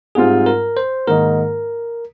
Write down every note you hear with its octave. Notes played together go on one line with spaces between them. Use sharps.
G#2 G3 C4 F4 G#4
A#4
C5
G#2 D#3 A#3 D#4 A#4